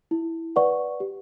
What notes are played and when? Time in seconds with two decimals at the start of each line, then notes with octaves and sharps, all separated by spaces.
0.11 E4
0.56 B4 D5 F#5 C#6
1.00 G4